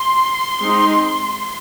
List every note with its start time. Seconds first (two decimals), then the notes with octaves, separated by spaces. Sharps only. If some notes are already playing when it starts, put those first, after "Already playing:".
Already playing: C6
0.62 G#3 C4 D#4